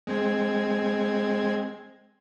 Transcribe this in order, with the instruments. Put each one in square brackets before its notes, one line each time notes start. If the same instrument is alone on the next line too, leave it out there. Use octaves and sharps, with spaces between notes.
[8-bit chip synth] G#3 C4 G#6